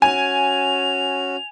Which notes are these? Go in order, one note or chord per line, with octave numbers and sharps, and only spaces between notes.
C#4 F#4 G#5 F7